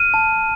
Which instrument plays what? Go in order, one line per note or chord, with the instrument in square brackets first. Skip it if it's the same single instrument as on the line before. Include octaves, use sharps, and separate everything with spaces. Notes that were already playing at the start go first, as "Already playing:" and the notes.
Already playing: [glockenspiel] F6 D#7
A5